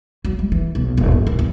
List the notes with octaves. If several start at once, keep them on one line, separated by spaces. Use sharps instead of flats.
F#3
G#3
E3
B1
D#1
G#2
D#1
E2